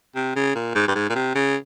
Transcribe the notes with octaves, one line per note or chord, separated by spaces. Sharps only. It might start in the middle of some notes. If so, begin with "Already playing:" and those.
C3
C#3
A#2
G#2
G2
G#2
A#2
C3
C#3